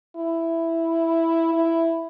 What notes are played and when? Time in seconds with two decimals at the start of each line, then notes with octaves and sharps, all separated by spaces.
0.16 E4
1.53 E4